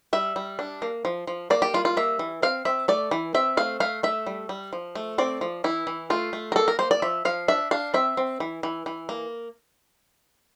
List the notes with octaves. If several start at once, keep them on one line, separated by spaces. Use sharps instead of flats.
G3 E5
G3
D4
A#3
F3
F3
A#3 D5
G4
G3 F4
F4
A#3 E5
E3
C4 F5
C4 E5
A3 D5
E3
C4 E5
A3 F5
A3 F5
A3 E5
G3
G3
F3
A3
C4 D5
F3
E3 E4
E3
A3 F4
A3
A#4
A#3 A4
A#4
A#3 C5
D5
F3 E5
F3 F5
D4 E5
D4 F5
C4 E5
C4
E3
E3
E3
A#3